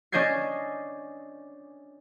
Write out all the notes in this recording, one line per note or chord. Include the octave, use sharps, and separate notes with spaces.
C#4 D4 D#5 G6 G#6 C7